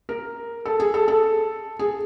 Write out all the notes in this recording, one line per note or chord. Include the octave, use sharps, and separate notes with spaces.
A#4
A4
G#4
A4
A4
G#4